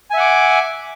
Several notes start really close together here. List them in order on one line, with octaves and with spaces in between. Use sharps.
G#5 E5 F#5 D6